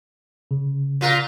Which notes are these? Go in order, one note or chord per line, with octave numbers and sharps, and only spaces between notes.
C#3
A#2 F4 A#4